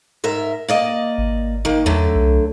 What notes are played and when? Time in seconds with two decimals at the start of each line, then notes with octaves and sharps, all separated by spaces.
0.24 G#2 A#4 E5
0.68 A#3 D5 D#5
1.18 G#1
1.65 D#3 A#3
1.86 E2 D3 F#3 A3
2.15 C2